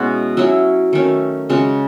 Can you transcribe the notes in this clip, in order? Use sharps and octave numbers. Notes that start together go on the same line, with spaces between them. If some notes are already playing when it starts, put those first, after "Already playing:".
Already playing: B2 G#3 C#4 E4 F#4
F#3 C#4 E4
D#3 A3 C#4
C#3 G#3 C#4 F#4